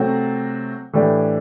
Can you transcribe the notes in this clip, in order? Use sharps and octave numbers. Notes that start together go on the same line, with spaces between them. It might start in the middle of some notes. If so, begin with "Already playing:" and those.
Already playing: C3 F#3 A3 C4 F#4
A2 E3 A3 D4 G4